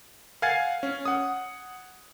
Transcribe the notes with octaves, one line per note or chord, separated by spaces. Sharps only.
F5 F#5 G#5 G#6 A6 C7
C#4
F#5 D#6